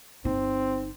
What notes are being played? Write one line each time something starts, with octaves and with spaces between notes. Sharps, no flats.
G1 C4 D#4